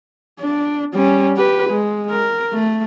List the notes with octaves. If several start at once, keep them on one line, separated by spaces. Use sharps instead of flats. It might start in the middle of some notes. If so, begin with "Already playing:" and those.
D4
G3 C#4
G4 B4
G#3
A#4
A3